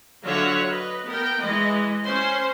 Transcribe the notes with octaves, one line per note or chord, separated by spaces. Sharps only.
D3 F#3 F4 C#5 E5 F#5
B4 D#5
B3 A#4 G5
E3 G#3 B4 D#5
C#4 C5 C6